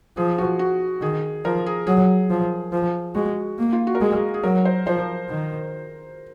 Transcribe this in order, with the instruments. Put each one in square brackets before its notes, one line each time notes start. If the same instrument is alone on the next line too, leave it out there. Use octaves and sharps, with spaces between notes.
[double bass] F3 [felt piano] G#4
[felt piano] F#4
F#4
[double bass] D#3 [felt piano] G#4
[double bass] F3 [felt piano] A#4
[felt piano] G#4
[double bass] F#3 [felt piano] G#4
[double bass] F3
F3
[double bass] G#3 [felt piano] F#4
[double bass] A#3
[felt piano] F4
F#4
A#4
[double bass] G#3 [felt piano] G#4
[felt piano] G#4
[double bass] F#3 [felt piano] A#4
[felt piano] C5
[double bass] F3 [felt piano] C5
[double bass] D#3